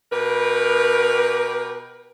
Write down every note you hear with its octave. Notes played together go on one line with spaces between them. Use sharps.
B2 G4 A#4 B4